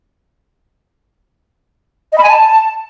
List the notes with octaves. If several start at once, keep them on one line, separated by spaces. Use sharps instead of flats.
D#5
B5
G#5
A5